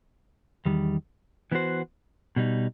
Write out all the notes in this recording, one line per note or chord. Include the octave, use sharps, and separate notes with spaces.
E2 D#3 G3
E3 B3 F#4 C5
B2 G3 D#4